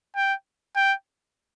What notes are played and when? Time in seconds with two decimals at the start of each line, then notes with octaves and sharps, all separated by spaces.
0.16 G5
0.76 G5